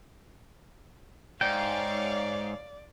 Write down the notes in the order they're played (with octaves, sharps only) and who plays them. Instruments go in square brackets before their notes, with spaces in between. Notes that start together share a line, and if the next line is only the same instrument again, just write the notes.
[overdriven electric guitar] G#2 [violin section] C#5 F5 [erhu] D5 [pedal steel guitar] G5